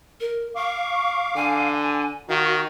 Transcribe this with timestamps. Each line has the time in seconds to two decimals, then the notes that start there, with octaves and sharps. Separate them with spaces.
0.20 A#4
0.56 F5 C#6 D6
1.36 D3 G#5
2.29 D#3 F#4 F5